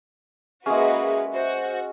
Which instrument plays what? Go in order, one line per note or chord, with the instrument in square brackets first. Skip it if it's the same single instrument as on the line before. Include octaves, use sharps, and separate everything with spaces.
[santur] G#3 C#4 [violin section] A#3 F#4 B4 [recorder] G#4 [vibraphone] E5
[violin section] F#4 [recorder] C5